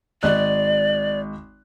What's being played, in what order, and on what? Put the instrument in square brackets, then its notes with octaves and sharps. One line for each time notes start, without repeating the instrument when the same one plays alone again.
[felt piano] G#1 D#5 F#6 [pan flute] D5